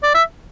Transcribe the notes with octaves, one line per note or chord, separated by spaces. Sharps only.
D5
E5